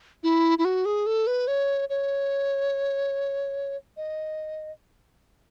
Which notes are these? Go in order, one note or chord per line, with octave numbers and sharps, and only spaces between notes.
E4
E4
F#4
G#4
A4
B4
C#5
C#5
D#5